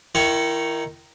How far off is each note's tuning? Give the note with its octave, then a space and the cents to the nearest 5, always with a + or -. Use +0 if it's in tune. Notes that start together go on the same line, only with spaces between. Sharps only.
D#3 +0 E4 +30 C#6 +0